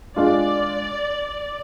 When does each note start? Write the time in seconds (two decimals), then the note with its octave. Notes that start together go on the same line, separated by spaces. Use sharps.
0.16 G#3 D4 F4 D5